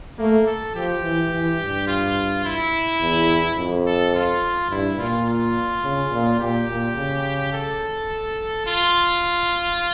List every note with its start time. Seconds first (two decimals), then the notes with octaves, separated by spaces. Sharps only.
0.18 A3 A#3
0.46 A4
0.75 F3 G4
1.03 E3
1.31 E3
1.60 G2
1.87 F4
2.45 E4
3.01 E2
3.58 F2
3.86 A4
4.15 F4
4.70 G2 E4
4.98 A#2 F4
5.27 F4
5.83 C#3
6.12 A#2
6.39 A#2 G4
6.68 A#2
6.96 C#3
7.53 A4
8.66 F4